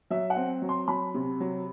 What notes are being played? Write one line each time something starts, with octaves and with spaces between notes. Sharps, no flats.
F#3 E5
F#5
C4
F#3
C6
F#3 B5
C3
F#3